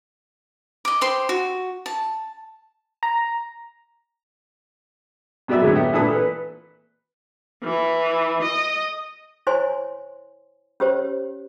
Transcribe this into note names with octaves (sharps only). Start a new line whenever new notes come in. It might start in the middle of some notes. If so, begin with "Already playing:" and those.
D#5 D6
G4 C5 C6
F#4
A5
A#5
F#2 B2 G3 D5 E5 E6
A2 D3 F#3 G#3
B3 G4 E5
A#2 E3 D4 A4 B4 D#6
B4
E3
D#5
E4 C5 C#5 G#5 C6
C#4 G4 C5 C#5